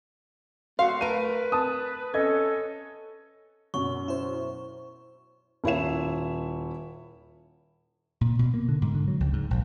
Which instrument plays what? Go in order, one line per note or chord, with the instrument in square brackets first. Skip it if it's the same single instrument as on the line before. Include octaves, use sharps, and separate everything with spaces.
[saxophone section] A3 F#4 [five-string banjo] F5 [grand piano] C6
[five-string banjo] A3 A#4 [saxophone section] B4 [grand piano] D#7
[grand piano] A5 D#6
[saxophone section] C#4 [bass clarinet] A4 [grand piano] D#5 G#6
[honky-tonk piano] F#2 B2 [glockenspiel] C#6
[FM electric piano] E4 C5
[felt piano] D#1 E4 C#5 E5 E7
[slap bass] A#2
B2
A#3
D3
G#2
D3
F#3
C#2
G#2
A#1